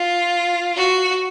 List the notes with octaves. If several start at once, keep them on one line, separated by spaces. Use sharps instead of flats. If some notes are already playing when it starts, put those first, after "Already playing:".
Already playing: F4
F#4